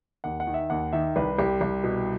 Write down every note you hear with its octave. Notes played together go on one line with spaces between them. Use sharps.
D#2 F#5
F#5
D#3
E5
D#2 F#5
D#3 E5
C2 B4
C2 G4
C2
B2